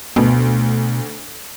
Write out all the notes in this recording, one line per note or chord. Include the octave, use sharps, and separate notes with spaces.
D2 B2